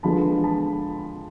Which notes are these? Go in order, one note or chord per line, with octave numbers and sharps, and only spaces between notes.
D3 F3 G#3 B3 A5 B5
A5 B5